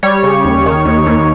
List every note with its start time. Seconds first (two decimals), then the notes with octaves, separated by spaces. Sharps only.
0.03 G3 C#5
0.23 C#3
0.44 D#2
0.66 D#3
0.85 D#2
1.06 D#2